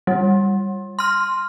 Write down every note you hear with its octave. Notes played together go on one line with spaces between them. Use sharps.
G3
C6 F6